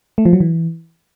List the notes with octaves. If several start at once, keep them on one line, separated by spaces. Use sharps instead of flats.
A3
F3
F#3
E3